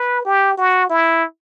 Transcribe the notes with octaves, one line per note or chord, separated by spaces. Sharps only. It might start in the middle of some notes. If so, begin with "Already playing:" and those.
Already playing: B4
G4
F#4
E4